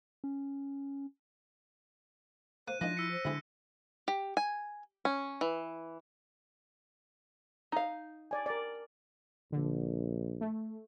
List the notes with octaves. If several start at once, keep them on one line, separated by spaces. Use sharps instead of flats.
C#4
A#3 C5 F#6 D#7
E3 F3 A#3 D4 D#4 F#6 A#6 D#7
E4 E6 B6 C#7
C5
B1 D3 E4 G#4
G4
G#5
C#4
E3
D#4 F5
D5 G#5
A#4 D5
A#1 D3
A3